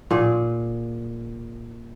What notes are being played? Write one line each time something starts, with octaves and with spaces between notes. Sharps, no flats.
A#2 G#4